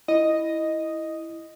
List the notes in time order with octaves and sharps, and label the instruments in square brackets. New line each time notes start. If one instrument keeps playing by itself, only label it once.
[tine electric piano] E4 [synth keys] D#5